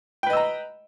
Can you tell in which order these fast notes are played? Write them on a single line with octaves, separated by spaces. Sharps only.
G5 B4 D#5 E6 A#5